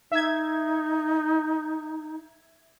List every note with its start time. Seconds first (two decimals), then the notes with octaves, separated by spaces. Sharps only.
0.12 D#4 E5 G#6